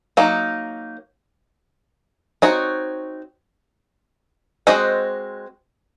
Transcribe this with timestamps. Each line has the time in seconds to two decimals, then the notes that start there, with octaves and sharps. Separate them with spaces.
0.17 F#3 A#3 D#4
2.42 C4 D#4 F#4 C#5
4.67 G#3 C4 F#4 C5 D#5